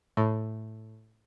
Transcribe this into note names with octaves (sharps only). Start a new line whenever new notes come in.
A2